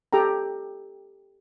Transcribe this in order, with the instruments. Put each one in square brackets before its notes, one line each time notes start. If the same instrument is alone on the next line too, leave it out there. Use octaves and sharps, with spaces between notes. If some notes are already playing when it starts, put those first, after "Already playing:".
[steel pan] G4 A4 G5 A#5